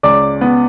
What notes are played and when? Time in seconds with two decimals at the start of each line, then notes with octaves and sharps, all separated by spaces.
0.03 C#2 D5 D6
0.41 B3